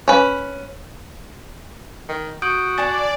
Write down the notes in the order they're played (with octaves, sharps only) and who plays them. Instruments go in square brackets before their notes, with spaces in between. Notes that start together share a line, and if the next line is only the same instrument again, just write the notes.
[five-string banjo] C#4 B4
[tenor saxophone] D#3
[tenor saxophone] F#4 [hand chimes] D#6 G6 D7
[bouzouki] D4 A5 [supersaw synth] D5 [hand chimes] G#5 A6